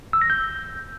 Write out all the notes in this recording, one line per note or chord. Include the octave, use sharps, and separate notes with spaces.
E6
A#6
G6